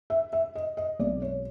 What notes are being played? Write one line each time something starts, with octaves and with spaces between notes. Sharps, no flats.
E5
E5
D#5
D#5
B1 B2 G#3 C4 D5
C#5